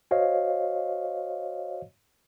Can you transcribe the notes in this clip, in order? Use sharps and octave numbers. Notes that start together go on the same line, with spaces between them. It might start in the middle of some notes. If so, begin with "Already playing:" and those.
F#4 C5 C#5 D#5 F5